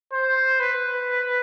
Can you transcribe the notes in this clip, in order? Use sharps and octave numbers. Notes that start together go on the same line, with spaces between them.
C5
B4